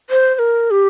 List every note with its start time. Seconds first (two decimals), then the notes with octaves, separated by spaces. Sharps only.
0.10 C5
0.35 C5
0.39 A#4
0.71 G4